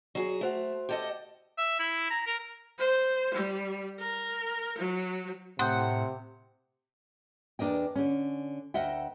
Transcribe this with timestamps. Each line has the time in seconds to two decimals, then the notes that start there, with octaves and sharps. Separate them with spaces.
0.15 F#3 G#4
0.41 A3 F#4 C5 F#5
0.89 G4 A4 D#5
1.58 E5
1.79 E4
2.10 A#5
2.27 A#4
2.79 C5
3.34 G3
3.99 A#4
4.78 F#3
5.59 A2 C3 F#5 C6 D#6 G6
7.59 E2 D4 A#4 D#5 G5
7.95 D3 C#4
8.74 D2 A#4 D#5 E5 F#5 G5